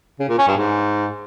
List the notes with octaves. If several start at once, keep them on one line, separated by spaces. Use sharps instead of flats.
C#3
A#2
C#4
G2
G#2